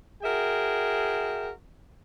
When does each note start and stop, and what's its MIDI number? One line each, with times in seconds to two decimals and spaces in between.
0.23 1.50 66
0.23 1.50 68
0.23 1.50 70
0.23 1.50 76
0.23 1.50 79